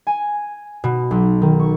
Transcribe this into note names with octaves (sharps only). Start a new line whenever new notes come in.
G#5
B2
B1
D#3
C#6